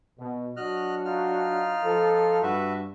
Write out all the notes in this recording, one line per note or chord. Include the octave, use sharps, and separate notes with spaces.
B2
F#3 D4 F#4 D#5 F6 F#6
D#4 F4 F6
F3 A4
G2 F#4 B4 E5